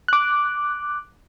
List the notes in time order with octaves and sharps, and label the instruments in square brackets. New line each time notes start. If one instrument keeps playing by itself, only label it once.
[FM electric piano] D6 F#6